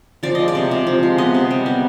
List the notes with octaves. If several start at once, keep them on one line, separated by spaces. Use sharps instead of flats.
F3 D5
G#3 D#5
D5
C3
C3
F3
G#3
B3 D#5
C3
G3
B3